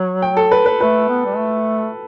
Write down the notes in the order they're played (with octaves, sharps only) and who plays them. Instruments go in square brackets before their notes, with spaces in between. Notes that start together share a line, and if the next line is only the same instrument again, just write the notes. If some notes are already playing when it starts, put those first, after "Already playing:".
Already playing: [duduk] F#3
[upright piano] G5
A4
B4
B4
[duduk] A3 [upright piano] B4
[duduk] B3
G3
A3